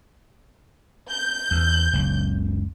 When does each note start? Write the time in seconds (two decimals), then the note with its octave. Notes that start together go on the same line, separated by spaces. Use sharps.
1.10 G6
1.51 E2
1.93 F#1 C#2